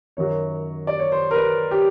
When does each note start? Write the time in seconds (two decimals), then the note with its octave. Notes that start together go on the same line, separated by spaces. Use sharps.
0.17 F#2 D#3 F#3 C#5
0.87 D5
0.99 C#5
1.12 C5
1.31 A#4
1.35 B4
1.71 G4